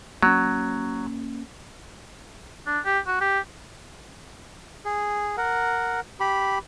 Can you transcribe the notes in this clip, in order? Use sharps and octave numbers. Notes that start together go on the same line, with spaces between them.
F#3 A#3 C#4
D4
G4
F#4
G4
G#4
A#4 F#5
G4 B5